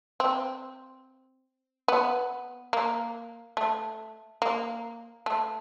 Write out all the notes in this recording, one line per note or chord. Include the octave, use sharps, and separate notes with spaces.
C4
B3
A#3
A3
A#3
A3